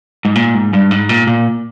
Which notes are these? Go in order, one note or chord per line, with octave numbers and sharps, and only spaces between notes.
G#2
A#2
G#2
G2
G#2
A#2
A#2